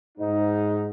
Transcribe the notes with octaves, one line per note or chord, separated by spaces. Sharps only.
G#2 D#4